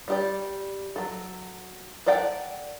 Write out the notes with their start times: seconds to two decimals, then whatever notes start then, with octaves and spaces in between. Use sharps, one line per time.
0.08 G3 G4 D5
0.96 F#3 A4
2.06 A4 A#4 D5 F#5 G5